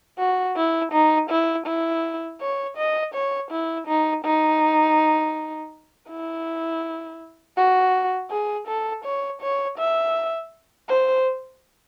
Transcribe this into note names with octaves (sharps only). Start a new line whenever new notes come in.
F#4
E4
D#4
E4
E4
C#5
D#5
C#5
E4
D#4
D#4
E4
F#4
G#4
A4
C#5
C#5
E5
C5